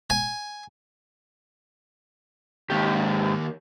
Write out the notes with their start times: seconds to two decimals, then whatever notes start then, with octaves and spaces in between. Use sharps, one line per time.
0.10 G#5
2.70 D#2 G#2 B2 G4